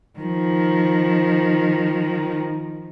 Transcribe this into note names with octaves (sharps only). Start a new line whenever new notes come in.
D#3 F3